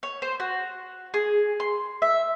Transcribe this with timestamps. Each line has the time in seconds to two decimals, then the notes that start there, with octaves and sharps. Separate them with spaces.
0.03 C#5
0.22 C5
0.40 F#4
1.14 G#4
1.60 C6
2.02 E5